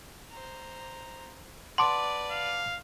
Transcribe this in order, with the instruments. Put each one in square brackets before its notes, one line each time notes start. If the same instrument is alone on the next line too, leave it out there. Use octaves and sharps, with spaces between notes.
[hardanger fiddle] C5 A#5
[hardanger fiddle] B4 D5 [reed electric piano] F#5 A5 D6 [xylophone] C6
[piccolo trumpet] F5